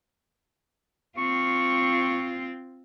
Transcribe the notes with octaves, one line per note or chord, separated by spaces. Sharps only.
C4 F4 C#6